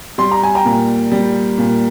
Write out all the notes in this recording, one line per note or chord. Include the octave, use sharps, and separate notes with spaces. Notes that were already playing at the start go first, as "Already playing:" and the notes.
G3 C6
A#5
G#5
G5 A#5
A#2
G3
A#2